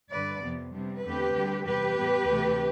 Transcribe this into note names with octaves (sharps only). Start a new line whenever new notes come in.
G2 D3 G3 B4 D5
F2 C3 F3 B3
C3 G3 B3 D4
E2 D3 A3 C4 G4 B4
D2 D3 G3
E2 C3 G3 G4 B4
A2 G3 B3
D2 C3 E3 A3